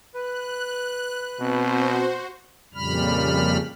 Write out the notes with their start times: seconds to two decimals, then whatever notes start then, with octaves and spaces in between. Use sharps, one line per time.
0.14 B4 F#6
1.40 B2 C4 F#4 C5
2.74 F2 A#2 C#3 G3 B5 F6